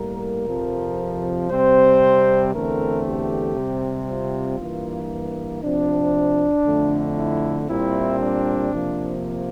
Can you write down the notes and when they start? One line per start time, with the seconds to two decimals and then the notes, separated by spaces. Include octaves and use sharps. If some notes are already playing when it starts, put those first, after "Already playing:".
Already playing: A2 G3 A#3 A#4
0.47 F2 C3 F3
1.50 C3 G3 C4 C5
2.54 E2 D3 A3 C4 A#4
3.05 G4
3.57 C3 G3 C4
4.08 F4
4.59 G2 E3 A#3
5.62 C3 F3 C4 D4
6.66 F2 D3 A3
7.17 E4
7.68 A#2 G3 C4 E4
8.20 D4
8.71 C3 F3 A#3